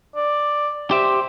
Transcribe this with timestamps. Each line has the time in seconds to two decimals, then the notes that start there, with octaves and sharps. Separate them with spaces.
0.16 D5
0.91 G4 C5 E5